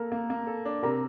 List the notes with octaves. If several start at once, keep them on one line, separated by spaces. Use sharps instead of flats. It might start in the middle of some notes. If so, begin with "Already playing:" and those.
Already playing: A#3 A4 A#4 A#5
A#3
A#3
A4
D4
C3 A#4 A#5